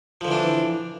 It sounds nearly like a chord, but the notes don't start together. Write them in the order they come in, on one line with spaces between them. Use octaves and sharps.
F3 D3 E3 D4